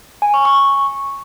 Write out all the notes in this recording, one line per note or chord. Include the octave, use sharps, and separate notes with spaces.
G#5
C#6
C#6